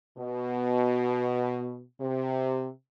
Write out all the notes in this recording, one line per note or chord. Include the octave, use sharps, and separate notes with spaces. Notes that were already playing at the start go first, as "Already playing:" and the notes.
B2
C3